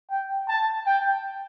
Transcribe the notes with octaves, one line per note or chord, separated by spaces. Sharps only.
G5
A5
G5